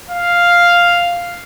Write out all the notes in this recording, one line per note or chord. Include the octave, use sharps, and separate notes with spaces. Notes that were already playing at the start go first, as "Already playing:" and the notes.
F5